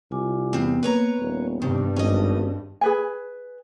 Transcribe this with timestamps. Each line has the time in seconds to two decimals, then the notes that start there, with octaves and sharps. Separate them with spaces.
0.12 C2 F4 G#5 D6
0.53 E2 B3 C4
0.83 A#3 B4 C#5 A#5
1.20 D#1
1.62 G2 C3 D#3
1.96 G#1 C#4 D#5
2.81 G#4 B4 G#5